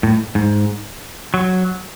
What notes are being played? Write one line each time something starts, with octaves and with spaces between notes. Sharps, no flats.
A2
G#2
F#3